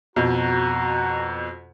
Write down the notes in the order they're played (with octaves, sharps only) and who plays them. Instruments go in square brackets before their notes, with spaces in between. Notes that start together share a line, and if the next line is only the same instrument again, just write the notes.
[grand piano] F2 B2 [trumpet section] F#4 A#5